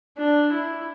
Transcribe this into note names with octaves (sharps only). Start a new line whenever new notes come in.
D4
E4